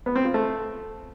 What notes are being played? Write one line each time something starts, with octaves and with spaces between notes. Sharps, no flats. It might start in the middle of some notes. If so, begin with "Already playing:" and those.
B3
C4
F4
A3